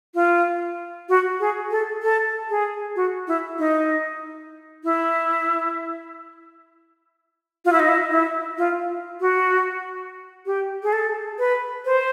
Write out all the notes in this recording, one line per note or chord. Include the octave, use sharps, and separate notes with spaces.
F4
F#4
G#4
A4
A4
G#4
F#4
E4
D#4
E4
F4
E4
D#4
E4
E4
F4
F#4
G4
G#4
A4
B4
C5